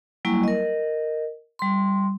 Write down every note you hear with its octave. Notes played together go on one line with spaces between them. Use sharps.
F#3 G3 A#3 E4 G#5 C#6
A#4 D#5
G3 C6